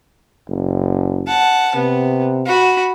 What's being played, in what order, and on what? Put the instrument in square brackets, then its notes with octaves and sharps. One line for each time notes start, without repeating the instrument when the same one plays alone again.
[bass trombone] F#1
[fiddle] F#5 A5
[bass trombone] C3 [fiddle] B3
[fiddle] F#4 B5